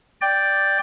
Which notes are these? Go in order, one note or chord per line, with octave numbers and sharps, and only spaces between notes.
D5 G5